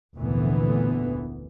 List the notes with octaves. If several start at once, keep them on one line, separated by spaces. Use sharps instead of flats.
F1 D2 A#2 D3 E3 B3